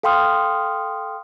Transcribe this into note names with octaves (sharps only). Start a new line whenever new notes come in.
A4 F5 G5 C6 D#6 F6